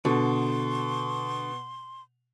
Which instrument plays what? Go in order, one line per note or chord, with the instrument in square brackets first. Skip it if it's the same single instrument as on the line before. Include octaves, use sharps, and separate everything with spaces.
[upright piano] B2 [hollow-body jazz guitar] D3 [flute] C6